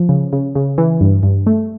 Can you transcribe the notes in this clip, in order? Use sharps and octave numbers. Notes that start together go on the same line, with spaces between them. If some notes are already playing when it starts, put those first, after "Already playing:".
Already playing: F3
C#3
C#3
C#3
E3
G2
G2
A3